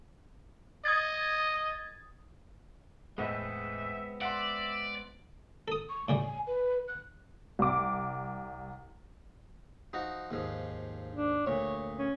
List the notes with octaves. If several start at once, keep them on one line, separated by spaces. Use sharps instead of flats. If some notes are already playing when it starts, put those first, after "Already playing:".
D#5 D#6 G#6 A6
E2 A2 G#3 B3 C4 D#5 E5
D5 E5 F#5 C6
A4 D#6
C#6
A2 C#3 G3 G#5
B4
F#6
C2 D6
F3 D#4 F#4
D#2 G#2 F3
D4
D2 A#2 C#5
C#4